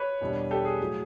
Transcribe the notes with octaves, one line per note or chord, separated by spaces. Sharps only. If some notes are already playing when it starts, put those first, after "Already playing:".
Already playing: B4 C#5
E2 B2 G3 A#3 D4
G4 A4
G#4
A2 F#3 A3